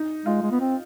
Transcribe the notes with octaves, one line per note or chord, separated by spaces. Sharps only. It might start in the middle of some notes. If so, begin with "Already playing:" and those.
Already playing: D#4
G#3 F4
G#3
B3
C4